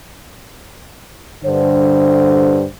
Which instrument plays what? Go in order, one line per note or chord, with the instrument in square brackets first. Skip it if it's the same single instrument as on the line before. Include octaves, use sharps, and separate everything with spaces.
[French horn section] G2 D3 C5